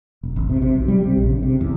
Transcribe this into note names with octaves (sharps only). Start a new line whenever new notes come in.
E1
G#1
C3
C3
B1
G3
C3
A#1
C#3
C3
E2